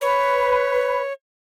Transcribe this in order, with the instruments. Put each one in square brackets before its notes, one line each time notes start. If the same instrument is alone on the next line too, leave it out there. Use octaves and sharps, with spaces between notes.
[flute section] B4 B5 [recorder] C#5